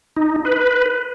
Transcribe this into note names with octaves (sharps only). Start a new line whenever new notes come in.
D#4
B4